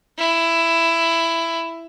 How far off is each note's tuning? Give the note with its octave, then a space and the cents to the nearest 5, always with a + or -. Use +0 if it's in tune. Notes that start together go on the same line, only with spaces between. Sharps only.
E4 +10